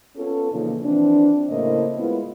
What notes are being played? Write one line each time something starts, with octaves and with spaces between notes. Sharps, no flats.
B3 C#4 F4 A4
A#2 C#3 E3 F3 A#3 D#4
E3 F3 C4 D4
A2 C#3 A#3 E4 C5 D#5
G#3 B3 E4 F4